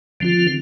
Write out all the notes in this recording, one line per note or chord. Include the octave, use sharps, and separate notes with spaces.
D3 F3 C4 F4